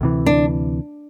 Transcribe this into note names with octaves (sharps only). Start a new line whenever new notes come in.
D2 C3 E3
D4